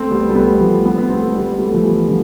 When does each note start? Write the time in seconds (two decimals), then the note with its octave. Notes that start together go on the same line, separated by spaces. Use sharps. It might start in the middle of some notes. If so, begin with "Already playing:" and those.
Already playing: A3 C4
0.11 G3 B3
0.29 A3
0.35 G3 B3
0.60 F3 A3
0.85 G3 B3
0.98 B3
1.09 A3 C4
1.28 A3
1.34 G3 B3
1.59 A3
1.66 B3
1.73 F3 A3
1.84 E3 G3
2.08 D3 F3